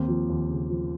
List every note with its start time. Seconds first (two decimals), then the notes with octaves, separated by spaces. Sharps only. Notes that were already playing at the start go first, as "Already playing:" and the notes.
Already playing: D#2 A#3 C4
0.08 F3
0.29 D#2
0.49 C#3
0.70 F3